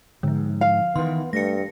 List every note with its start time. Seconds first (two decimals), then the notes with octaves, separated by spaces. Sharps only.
0.23 G#2 D3 F3
0.61 F5
0.96 D#3 E3 B3 C6
1.33 G2 A3 A#6 C#7